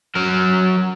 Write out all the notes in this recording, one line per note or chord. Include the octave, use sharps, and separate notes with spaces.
F#3 A#4